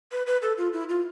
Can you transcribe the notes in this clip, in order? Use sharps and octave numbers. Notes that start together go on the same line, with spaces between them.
B4
B4
A4
F4
E4
F4